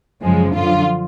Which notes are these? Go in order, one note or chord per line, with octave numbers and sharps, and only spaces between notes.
F#2 C#3 F3 G#3
F#2 D3 F3 F4